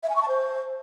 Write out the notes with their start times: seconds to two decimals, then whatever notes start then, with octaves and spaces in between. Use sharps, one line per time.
0.03 E5
0.09 G#5
0.15 C#6
0.22 A5
0.28 C5